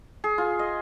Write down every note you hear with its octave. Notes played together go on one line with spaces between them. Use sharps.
G#4
F4
D#5